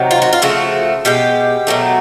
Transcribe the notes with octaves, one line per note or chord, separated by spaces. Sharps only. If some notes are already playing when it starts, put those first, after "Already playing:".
Already playing: C3 D#3 F#3
F4
F#4
F4
C#3 F3 A3 F#4
B2 G#3 G4
B2 F#3 A3